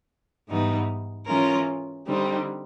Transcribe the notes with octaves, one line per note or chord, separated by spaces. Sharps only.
G#2 E3 G3 B3 D#4
E3 G#3 C#4 F4 A#4
D3 G3 C4 D#4